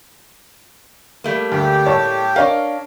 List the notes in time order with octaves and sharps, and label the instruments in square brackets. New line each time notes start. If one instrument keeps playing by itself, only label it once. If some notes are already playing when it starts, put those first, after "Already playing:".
[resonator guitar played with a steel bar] G3 A3 A#3
[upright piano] D2 [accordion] G4
[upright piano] A2 C#5 A5
[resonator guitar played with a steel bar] D4 D#5 F5 [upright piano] A#4 C#5